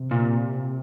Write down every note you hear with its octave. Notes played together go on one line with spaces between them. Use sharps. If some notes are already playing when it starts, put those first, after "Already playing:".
Already playing: C3
A#2